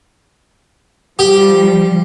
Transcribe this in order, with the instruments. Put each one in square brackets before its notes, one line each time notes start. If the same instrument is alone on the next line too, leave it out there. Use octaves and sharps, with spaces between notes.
[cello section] F3 G3 [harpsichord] G4